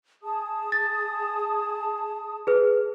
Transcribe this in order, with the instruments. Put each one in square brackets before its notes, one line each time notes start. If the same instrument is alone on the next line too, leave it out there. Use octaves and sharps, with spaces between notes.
[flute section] G#4 A5 D#6
[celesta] A6
G#4 B4